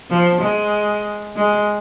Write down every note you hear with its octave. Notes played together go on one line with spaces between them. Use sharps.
F3
G#3
G#3